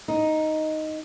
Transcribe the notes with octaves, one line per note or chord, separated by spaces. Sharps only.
D#4